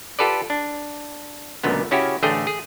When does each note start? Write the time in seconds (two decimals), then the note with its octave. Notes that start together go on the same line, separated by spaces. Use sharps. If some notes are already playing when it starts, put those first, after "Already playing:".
0.19 F4 G4 A4 B4 D5
0.50 D4
1.63 C#2 F#2 A#2 D3 B3
1.91 C#3 C#4 E4 F#4 G4
2.22 A1 D3 A3 G#4 G5
2.47 G#4